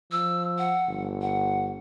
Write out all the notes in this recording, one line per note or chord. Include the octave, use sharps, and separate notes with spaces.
F3 E6
F#5
G1
F#5